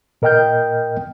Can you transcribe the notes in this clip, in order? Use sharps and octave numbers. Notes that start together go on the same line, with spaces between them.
A#2 A#4 D#5 G5 F6 G6